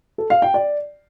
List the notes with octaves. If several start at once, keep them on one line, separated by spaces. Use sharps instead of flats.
A4
F5
G5
D5